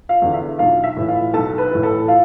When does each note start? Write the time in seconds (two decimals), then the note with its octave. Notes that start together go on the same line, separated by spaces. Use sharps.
0.09 F4 F5
0.22 E2 D3
0.34 E5
0.58 B1 F4 F5
0.84 E5
0.96 A2 E3
1.08 F4 F5
1.34 B1 A4 A5
1.58 B4 B5
1.71 A2 E3
1.83 A4 A5
2.08 F4 F5